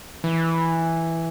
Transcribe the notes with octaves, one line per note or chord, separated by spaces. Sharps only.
E3